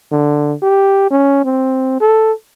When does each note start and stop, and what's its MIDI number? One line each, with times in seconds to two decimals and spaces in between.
0.12 0.54 50
0.63 1.07 67
1.11 1.42 61
1.45 1.97 60
2.01 2.33 69